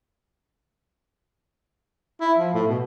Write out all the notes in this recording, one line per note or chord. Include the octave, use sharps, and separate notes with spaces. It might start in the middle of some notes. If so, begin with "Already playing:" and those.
E4
F3
A2
B2